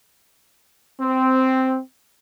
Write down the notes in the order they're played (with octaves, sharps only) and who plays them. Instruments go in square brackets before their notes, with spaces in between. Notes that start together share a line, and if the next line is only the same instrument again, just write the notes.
[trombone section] C4